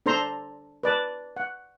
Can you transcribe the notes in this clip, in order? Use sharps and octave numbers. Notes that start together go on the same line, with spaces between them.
D4 A4 C5 A#5 C6
B4 D5 A5
F#5